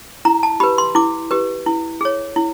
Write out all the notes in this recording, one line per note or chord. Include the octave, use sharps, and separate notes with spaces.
E4 A#5
A5
G4 B4 B5
C6
E4 D6
G4 B4
E4
G#4 C#5
E4